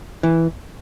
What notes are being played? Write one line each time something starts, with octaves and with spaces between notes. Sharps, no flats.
E3